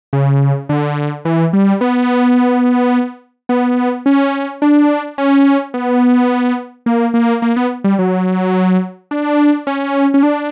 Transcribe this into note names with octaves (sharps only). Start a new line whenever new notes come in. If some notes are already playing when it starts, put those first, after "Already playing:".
C#3
D3
E3
G3
B3
B3
C#4
D4
C#4
B3
A#3
A#3
A#3
B3
G3
F#3
D4
C#4
C#4
D4